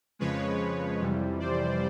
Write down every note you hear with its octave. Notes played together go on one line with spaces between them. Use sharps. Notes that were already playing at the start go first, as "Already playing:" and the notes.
F2 C#3 F3 G#3 B4 C#5
F2 C3 E3 G3
C5 D5